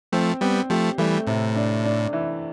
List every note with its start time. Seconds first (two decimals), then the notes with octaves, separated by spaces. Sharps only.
0.12 F3 A3 C4
0.41 G3 B3 C4
0.70 F3 A3 G4
0.98 E3 G3 A3
1.27 A2 C3
1.55 D4
1.84 D4
2.13 E3